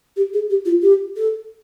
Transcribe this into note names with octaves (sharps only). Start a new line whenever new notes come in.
G4
G#4
G4
F4
G4
A4